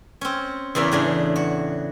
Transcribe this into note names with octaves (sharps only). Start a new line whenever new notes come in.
C4 C#4
E2 C#3 E3 A#4 B4
A2 C#3 D4
F#4